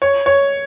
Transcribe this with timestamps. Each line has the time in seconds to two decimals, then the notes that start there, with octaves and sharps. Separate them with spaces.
0.02 C#5
0.26 C#5